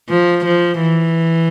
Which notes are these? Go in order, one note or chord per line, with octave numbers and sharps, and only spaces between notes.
F3
F3
E3